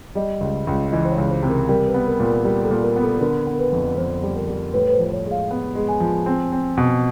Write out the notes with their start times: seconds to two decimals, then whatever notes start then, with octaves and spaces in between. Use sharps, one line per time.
0.15 G3 D#5
0.41 C#2
0.67 C#2
0.92 E3 D#5
1.05 C5
1.11 C#5
1.18 C#2
1.30 C5
1.43 C3
1.49 A#4
1.69 G3 A#4
1.87 B4
1.94 B3
2.07 A#4
2.20 A#2
2.26 A#4
2.45 G3 A#4
2.63 A4
2.71 A#2
2.83 A#4
2.96 B3
3.02 A4
3.16 B4
3.21 D3 A#4
3.47 B3
3.54 A#4
3.59 B4
3.72 F2
3.97 F2 C5
4.23 G3
4.36 A#4
4.48 G3
4.74 A2 B4
4.88 B4
4.93 C5
4.99 F3
5.12 C#5
5.25 G#3
5.31 F5
5.51 B3
5.75 G#3
5.88 G#5
6.00 F3
6.26 C4
6.52 C4
6.77 B2